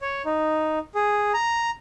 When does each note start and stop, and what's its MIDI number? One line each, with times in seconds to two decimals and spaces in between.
0.01 0.22 73
0.25 0.79 63
0.95 1.32 68
1.34 1.70 82